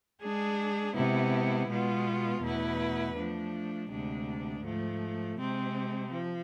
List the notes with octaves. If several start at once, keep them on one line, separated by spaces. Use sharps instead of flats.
G#3 D4 G#4
C3 G#3 B3 E4
B2 G#3 B3 F4
E2 B2 A3 E4 B4
F3 A3 D4
D2 C3 G#3 D4
G#2 F3 A3
C3 G#3 C4
F3